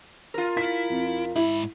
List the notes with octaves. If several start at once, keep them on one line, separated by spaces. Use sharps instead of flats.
F4 A#4
E4 B6
F2
G#2 E4 B5